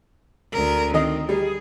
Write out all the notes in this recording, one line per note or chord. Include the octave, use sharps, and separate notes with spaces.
D2 A#4
D#3 C4 D#5
G3 G#4